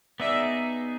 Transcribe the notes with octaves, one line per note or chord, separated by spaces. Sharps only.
B3 D#4 G#4 D5 E5